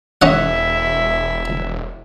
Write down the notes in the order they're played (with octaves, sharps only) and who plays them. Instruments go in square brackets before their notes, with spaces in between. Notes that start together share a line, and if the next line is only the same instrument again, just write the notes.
[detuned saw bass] E1 [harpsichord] C#4 D#5 F#5 [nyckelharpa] E4 E5